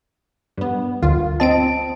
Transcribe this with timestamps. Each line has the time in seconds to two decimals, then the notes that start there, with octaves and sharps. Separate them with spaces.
0.57 G2 B3
1.02 G1 D2 F4
1.40 C4 D#5 A5 D7